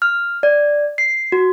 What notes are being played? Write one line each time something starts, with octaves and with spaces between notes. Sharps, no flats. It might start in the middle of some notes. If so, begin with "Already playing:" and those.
F6
D5
C7
F#4